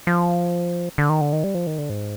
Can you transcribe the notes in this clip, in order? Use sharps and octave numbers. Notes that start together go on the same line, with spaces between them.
F3
D3
D#3
D3
D#3
G3
F3
D#3
D3
G#2